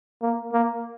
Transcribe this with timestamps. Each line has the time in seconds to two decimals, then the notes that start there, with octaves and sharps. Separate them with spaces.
0.22 A#3
0.53 A#3